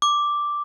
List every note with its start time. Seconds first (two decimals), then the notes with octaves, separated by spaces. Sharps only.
0.02 D6